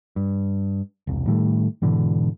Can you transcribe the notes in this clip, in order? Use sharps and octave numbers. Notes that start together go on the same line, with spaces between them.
G2
E1 C2
A2 D#3 G3 A3
G#2 B2 D3 E3